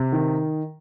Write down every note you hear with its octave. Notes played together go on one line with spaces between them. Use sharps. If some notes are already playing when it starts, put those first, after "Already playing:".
Already playing: C3
D#3